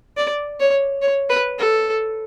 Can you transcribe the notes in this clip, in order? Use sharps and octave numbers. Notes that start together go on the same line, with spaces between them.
D5
C#5
C#5
B4
A4